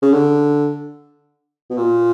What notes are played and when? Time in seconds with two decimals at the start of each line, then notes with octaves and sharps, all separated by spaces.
0.02 C#3
0.13 D3
1.70 B2
1.77 A#2